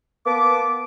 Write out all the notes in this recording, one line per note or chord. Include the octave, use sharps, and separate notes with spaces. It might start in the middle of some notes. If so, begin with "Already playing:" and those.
A#3 B3 A5 D6